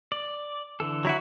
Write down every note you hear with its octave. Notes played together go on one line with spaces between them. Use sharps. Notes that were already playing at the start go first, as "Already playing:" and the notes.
D5
D3 E3 A4
F#3 E4 F#4